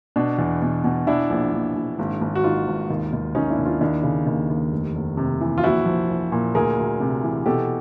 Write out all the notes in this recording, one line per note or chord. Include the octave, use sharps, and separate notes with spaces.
B2 D4
E2
B2
B2
E3 D4 E4
A#1
A#1
A#1
G#1
G#1
F#4
G#1 D#4 F4
G#1
D#2
D#2
D#2 C#4 D#4
D4 E4
D#2
D#4 F4
D#2 D4 E4
C#3
D#2
D#2
F1
F1
C3
E3
F4
A#1 E4 F#4
F3
A#1
A#2
D2 G#4 A#4
D2
C3
E3
B2 G4 A4